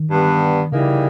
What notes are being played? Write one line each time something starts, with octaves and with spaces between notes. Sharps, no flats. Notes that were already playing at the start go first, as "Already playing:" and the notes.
Already playing: D#3
G2 G3 B3
C#3 E3 G3 A#3 D#4 G#4